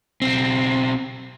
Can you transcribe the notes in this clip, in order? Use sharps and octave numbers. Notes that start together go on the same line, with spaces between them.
B1 C4